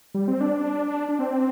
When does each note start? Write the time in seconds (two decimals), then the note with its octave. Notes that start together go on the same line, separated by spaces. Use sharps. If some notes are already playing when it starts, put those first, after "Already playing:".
0.14 G3
0.28 C4
0.41 D4
1.09 D4
1.19 C4